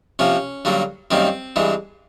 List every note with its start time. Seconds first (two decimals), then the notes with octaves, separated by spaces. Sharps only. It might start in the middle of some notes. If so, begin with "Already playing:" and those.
0.19 C3 F3 A#3 C#4
0.65 G2 D3 F#3 A#3
1.11 F#2 D#3 G3 A#3 C4
1.56 G2 E3 G#3